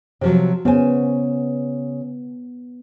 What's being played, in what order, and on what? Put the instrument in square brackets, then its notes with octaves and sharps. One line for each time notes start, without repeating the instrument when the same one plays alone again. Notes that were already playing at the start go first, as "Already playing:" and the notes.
[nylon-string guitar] C3 F3 F#3
[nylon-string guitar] C#3 C5 G#5 [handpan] B3